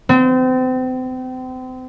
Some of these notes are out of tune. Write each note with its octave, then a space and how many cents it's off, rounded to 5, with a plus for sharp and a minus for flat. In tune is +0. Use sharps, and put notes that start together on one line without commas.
C4 -35